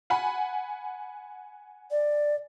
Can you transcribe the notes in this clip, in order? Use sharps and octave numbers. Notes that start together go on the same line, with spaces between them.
F#5 G#5 B5
D5